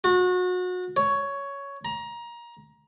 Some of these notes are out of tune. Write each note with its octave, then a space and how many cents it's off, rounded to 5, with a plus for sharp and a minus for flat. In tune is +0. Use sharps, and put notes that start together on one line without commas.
F#4 -30
C#5 +10
A#5 +25